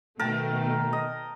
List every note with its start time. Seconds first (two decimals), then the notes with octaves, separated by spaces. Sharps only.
0.19 B2 D#3 A3 A#4 G5 A5
0.93 D#5